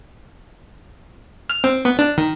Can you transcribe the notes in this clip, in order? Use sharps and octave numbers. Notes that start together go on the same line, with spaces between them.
F6
C4
B3
D4
D#3